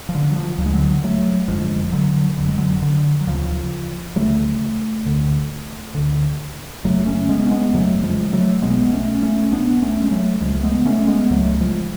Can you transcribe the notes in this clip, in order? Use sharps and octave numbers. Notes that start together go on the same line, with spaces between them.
F3
D3
F#3
F3
D2 C#3 F#3
G#3
D3 F#3
F#3 A3
F#1 F2 D3 F3 G#3
D3 F#3
F#1 F2 D3 F#3
G#3
D3 F#3
D3
F#3
D2 C#3 F3
D2 C#3 F#3 A3
D2 D3
D2 D3
F1 F2 C#3 F#3 A3
A3 C#4
G#3 B3
C#4
G#3 B3
F1 F2 C#3 F#3 A3
F3 G#3
F#3 A3
B1 B2 G#3 B3
A3 C#4
A3 C#4
B1 B2 B3 D4
A3 C#4
G#3
F#3 A3
C#2 C#3 F3 G#3
A3
G#3 B3
A3 C#4
G#3 B3
C#2 C#3 F#3 A3
F3 G#3